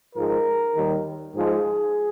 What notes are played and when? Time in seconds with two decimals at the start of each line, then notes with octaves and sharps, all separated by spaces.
0.16 G#2 F3 G#3 A#4
0.75 D#2 D#3 G3
1.34 G#2 F3 G#3 G#4